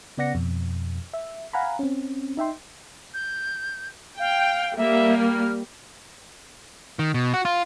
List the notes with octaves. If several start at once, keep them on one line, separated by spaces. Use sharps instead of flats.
C#3 B3 D5 F#5 A#6 C#7
F2 B2
E5
F5 F#5 G#5 A#5 B5
C4 C#4
D#4 E5 G5 C6
G6
F5 G5
G3 A#3 E5
F6
D#3
B2
F#4
F4